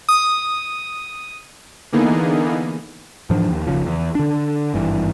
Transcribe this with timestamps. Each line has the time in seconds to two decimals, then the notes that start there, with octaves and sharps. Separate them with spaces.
0.09 D#6
1.92 D3 E3 A#3 B3 D#4 G#4
3.30 G#2 E3 F3 D4
3.50 D#2
3.67 F#1 C2 C#3 F3
3.86 E2
4.15 D3 D4
4.74 G#1 G2 E3